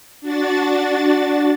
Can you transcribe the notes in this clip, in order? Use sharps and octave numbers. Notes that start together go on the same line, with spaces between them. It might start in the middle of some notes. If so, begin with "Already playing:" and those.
D4 F#4 A6